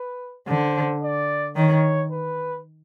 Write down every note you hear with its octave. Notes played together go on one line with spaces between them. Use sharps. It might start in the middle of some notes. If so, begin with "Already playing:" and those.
Already playing: B4
D3 C5
D5
D#3 C#5
B4